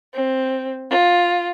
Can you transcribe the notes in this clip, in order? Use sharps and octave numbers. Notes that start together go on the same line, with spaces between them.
C4
F4